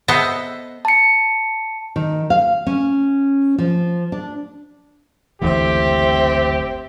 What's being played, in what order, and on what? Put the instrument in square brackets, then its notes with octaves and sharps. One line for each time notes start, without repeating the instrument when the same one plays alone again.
[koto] B3 A4 C5 D#5 E5 A5
[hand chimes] A5 C#7
[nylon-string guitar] D#3
F5
C#4
F3
D4
[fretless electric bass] F#1 D2 E3 [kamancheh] C4 E5 [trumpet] G4